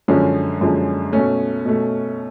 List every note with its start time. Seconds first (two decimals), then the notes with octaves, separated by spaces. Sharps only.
0.08 F#2 D3 F3 G#3 C#4
0.61 F#2 D3 F3 G#3
1.12 B2 A3 C#4
1.65 B2 A3